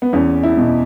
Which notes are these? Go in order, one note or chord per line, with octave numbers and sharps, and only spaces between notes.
B3
E2 C#4
E4
B2